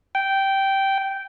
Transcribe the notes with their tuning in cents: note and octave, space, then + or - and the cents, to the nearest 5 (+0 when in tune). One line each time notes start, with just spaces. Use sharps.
G5 -10